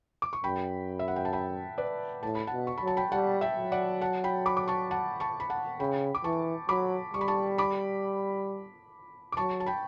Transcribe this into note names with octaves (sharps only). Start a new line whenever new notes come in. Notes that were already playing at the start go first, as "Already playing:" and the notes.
D6
C#6
F#2 G5 B5
E5
F#5
G5
A5
G5 B5
B4 D5
A2 A5
B5
F#5 A5
B2
C#6
F#3 B5
A5
G5 B5
G3 F#5 A5
E5 G5
F#3
D5 F#5
F#5 A5
G5 B5
B5 D6
D6
A5 C#6
F#5 A5
A5 C#6
B5
F#5 A5
C#3 G5 B5
D6
E3 A5 C#6
F#3 B5 D6
G3 C#6
B5
A5 C#6
B5 D6
D6
F#3 A5 C#6
A5
G5 B5